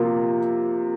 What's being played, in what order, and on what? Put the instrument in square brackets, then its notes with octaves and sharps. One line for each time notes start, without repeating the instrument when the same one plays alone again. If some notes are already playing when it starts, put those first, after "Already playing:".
Already playing: [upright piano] C3 F3 A#3 F4